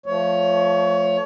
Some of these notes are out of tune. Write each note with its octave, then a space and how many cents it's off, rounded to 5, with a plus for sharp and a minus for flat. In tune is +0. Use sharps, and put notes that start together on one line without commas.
F3 +0 A3 +0 C#5 +25